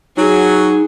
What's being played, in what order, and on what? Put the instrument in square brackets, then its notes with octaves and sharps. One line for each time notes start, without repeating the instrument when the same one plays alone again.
[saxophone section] F#3 [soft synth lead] D#4 [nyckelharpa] G#4